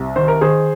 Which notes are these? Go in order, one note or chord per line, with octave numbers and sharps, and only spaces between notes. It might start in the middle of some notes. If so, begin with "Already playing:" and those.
Already playing: C2
D#3 C5
A#4
D#3 G#4 C5